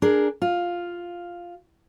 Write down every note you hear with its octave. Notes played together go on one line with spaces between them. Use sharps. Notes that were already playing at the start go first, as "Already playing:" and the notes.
D4 G#4 A#4
F4